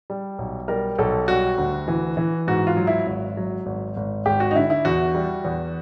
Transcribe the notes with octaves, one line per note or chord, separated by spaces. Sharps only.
G3
B1
G3 A#4
B1 A4
G3 F#4
D2
E3
E3
G#2 F#4
F4
F#3
E4
G#1
F#3
G#1
G#1
G#1 G4
F#4
D#4
D3 E4
E4
E2 F#4
G3
E2